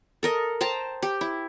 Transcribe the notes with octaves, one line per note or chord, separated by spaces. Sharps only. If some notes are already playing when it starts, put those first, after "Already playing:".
A4 A#4 D#5
C5 G5 A5 A#5
G4
E4